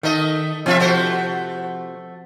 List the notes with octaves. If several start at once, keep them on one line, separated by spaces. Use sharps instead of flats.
D#3 A3 D#5
C3 F3 C4 F4 E5
A3 F#4 C5